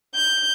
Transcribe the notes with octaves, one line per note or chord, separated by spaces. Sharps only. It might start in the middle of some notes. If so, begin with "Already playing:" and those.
G6